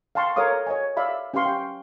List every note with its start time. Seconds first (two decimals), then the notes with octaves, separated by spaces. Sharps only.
0.15 F5 G5 A5 C6 C#6
0.36 A4 A#4 C#5 F5 D6 D#6
0.67 C#5 D#5 G#5
0.97 D5 E5 F5 B5
1.34 C#4 G4 B4 F5 C6 C#6
1.46 G5